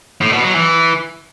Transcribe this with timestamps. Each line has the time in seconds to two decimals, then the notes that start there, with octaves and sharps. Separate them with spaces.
0.21 A2
0.33 B2
0.44 F#3
0.55 E3